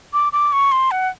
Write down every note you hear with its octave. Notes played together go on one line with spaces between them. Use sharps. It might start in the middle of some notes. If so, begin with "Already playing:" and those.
D6
D6
C#6
C6
F#5